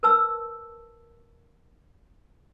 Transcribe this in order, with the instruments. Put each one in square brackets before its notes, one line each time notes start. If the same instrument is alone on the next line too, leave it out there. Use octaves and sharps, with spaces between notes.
[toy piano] A#4 B4 A5 E6